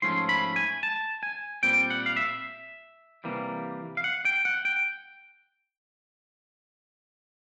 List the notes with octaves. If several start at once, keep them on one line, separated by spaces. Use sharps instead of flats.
G#2 F3 A3 C#4 C6
B5
G#5
A5
G#5
A#2 G3 C4 G5
F#5
F5
E5
C3 E3 G3 A#3
F5
F#5
G5
F#5
G5